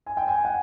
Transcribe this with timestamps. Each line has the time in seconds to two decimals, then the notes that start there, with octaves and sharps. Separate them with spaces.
0.06 G#5
0.17 G5
0.28 G#5
0.45 F#5